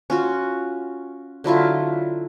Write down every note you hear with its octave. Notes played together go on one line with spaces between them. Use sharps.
C#4 F4 F#4
D3 F#3 E4 F4